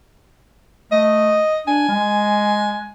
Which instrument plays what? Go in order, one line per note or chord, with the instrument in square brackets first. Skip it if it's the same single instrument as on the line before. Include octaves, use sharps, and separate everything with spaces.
[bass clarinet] A3 [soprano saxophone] D#5
[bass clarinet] D4 [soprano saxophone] G#5
[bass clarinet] G#3